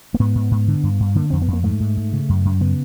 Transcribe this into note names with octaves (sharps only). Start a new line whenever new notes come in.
A#3
G#2 B3
G#2
G#2
D3
G2
G2
D3 A#3
F2 C4
B3
F2
A#3
G#2 A3
G#2
G#2
C#3
F#2
F#2
C#3 B3